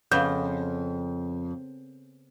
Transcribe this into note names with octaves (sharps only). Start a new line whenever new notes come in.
F2 C#3 B3 G6